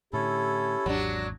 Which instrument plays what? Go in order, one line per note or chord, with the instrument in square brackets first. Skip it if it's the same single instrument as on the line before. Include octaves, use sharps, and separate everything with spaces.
[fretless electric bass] A2 D3 [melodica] C#4 E4 A4 [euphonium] G4
[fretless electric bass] G#1 E2 G#2 [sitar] F#3 D4